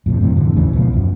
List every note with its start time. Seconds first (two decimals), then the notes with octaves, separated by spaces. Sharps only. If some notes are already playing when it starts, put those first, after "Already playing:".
0.06 F2 A2 C3
0.21 G2 C3 E3
0.35 F2 A2 D3 E3
0.56 A1 E2 C#3 E3
0.73 C#2 B2 E3 F3
0.93 C#2 F#2